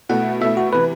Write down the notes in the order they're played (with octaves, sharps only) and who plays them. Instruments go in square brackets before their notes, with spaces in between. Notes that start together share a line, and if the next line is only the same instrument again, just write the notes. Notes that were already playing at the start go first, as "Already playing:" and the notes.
[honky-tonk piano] B2 A3 E4 [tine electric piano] F#5
[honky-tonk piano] B2 A3 E4 [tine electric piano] E5
[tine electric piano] F#4
[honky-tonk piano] C3 E3 [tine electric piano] B4